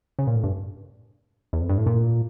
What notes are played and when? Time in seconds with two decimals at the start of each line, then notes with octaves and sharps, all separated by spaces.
0.19 C#3
0.27 A#2
0.36 A2
0.44 G2
1.53 E2
1.61 F2
1.69 G2
1.78 A2
1.86 A#2